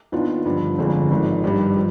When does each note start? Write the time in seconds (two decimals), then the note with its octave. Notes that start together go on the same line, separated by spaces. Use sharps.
0.12 D#2 D#3 B3 D4 F4
0.46 G2 D3 F3
0.78 G1 F2 D3 F3 G#3
1.11 G#1 G#2 F3
1.44 G2 D#3 G3
1.76 F3